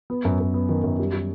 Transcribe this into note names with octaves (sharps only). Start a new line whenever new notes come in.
B3
F#2
F#2
B3
D#3
F#2
G3
G3